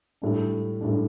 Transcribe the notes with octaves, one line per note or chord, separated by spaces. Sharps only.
A2 G3 D4
A2 G3 D4